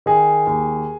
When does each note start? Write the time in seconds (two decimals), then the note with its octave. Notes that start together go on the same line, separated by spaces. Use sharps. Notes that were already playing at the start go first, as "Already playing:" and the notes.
0.06 D#3 G#4
0.47 D#2